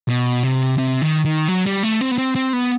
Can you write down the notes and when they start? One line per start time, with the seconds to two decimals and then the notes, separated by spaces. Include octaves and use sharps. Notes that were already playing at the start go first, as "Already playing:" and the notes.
0.08 B2
0.43 C3
0.78 C3
1.02 D#3
1.25 D#3
1.48 F#3
1.66 G3
1.83 A3
2.01 C4
2.11 B3
2.18 C4
2.35 C4
2.53 B3